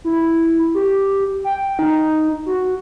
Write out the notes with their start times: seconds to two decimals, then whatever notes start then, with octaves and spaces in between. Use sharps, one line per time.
0.04 E4
0.74 G4
1.44 G5
1.79 D#4
2.46 F#4